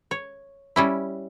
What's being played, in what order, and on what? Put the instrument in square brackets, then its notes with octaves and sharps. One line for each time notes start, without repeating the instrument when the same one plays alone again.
[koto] C#5
G3 C#4 E4